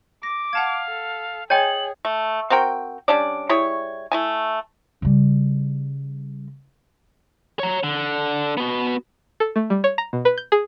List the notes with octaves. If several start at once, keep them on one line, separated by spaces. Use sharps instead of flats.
D6 A#6
F5 F#5 A5 G#6
A4
G#4 C#5 D#5 G5 G#5 G#6 F#7
A3
C4 F#4 A#4 G5
G3 C#4 D4 D5
G3 E4 G#4 C#5
A3 E4 G#5
C#3 G3
C#5 A#5
D3
B3 F#4
A4
A3
G3
C#5
A#5
B2
B4
G6
G#4